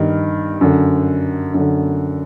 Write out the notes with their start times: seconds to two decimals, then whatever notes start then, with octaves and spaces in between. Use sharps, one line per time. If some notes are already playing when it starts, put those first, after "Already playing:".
Already playing: G2 D#3
0.61 F#2 D3
1.54 F#2 D3